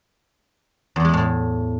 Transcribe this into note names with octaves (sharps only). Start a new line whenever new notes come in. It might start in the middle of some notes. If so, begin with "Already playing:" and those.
E2
G#3
A2